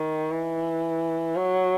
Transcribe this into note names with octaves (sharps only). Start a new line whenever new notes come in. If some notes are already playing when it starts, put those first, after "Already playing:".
Already playing: D#3
E3
F#3